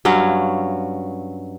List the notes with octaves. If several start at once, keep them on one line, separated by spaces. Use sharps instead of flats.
G2 F#3 C#4 F5